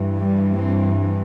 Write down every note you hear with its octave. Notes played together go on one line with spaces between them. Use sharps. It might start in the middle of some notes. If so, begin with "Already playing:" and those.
Already playing: G2 E3
G3
C4